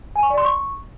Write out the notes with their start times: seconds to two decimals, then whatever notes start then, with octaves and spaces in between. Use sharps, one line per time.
0.16 G#5
0.23 C#6
0.30 D5
0.38 C6
0.45 C#6